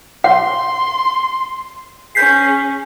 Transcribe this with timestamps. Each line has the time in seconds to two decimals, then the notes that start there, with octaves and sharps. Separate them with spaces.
0.24 F#5 C6
2.15 C#4 G#4 G6 B6 C7